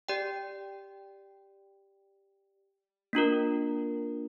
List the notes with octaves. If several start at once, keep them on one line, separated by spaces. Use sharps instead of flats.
G4 D5 G5
A#3 D4 F4 A#4